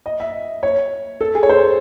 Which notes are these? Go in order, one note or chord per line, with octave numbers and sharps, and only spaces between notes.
D#5
E5
C#5
A4
G#4
C#5
C5